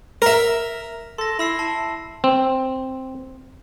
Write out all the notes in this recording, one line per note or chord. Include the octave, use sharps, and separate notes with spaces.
A#4 E5
A4 C6 A#6
E4 B5 E6 C7
A5
C4